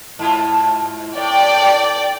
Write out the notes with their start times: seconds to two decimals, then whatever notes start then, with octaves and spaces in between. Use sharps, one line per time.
0.19 G#2 E4 F4
1.17 A2 D5 G5